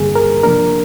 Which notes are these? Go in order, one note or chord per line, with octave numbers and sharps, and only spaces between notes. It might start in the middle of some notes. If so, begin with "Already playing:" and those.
Already playing: G2 D3 G3 A#3 G#4
A#4
C3 F3 A#3 D4 A#4